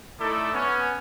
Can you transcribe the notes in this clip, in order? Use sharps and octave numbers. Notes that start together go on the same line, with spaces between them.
A3 D#4 E4 A4 D5 D6
B3 C#4